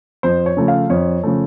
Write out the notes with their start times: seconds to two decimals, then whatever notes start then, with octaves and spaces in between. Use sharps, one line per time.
0.23 F2 C5
0.46 C#5
0.57 C#3 F3 A3
0.68 F5
0.90 F2 C#5
1.23 C#3 F3 A3